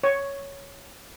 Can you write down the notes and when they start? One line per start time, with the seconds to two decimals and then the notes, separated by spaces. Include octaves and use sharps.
0.04 C#5